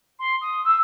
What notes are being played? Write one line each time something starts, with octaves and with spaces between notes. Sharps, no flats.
C6
D#6
E6